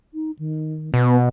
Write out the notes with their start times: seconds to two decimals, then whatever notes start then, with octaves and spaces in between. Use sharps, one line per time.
0.14 D#4
0.39 D#3
0.94 B2 B3